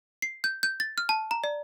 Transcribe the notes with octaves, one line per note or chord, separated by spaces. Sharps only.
C7
G6
G6
A6
F6
A5
A#5
D5